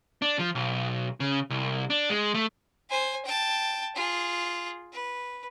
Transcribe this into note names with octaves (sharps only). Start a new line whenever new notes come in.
D4
F3
B1
C#3
C2
D4
G#3
A3
C5 G#5
G5 A5
F4 G#4
B4